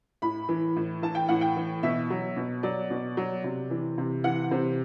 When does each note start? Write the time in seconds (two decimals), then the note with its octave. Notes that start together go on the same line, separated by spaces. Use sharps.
0.22 A2 B5
0.49 E3
0.76 A2
1.02 E3 A5
1.15 G5
1.28 A2 F#5
1.41 G5
1.56 E3
1.83 B2 E5
2.10 F#3
2.37 B2
2.63 F#3 D5
2.90 B2
3.17 F#3
3.44 C3
3.70 E3
3.98 C3
4.24 E3 F#5
4.51 C3 C5